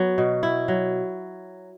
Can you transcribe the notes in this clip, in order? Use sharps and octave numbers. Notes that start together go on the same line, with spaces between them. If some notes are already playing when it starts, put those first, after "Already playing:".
Already playing: F#3 B3
B2
E4
F#3